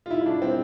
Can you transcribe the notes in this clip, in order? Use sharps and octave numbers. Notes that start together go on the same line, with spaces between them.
F4
E4
D4
C4